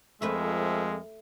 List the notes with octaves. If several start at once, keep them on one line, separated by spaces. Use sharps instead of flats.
F2 F3 G#3 A3 A#4 B4 E5